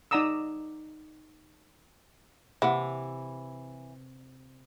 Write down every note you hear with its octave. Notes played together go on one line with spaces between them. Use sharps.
D#4 D5 F#5 A#5 D#6 E6
C3 E3 A#3 F#5